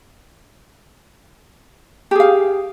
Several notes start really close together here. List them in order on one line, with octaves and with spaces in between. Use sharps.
G4 G#4 F5